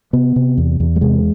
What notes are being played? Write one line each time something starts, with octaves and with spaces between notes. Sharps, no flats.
C3 B3
C3
E2
E2
G3
C3 G#3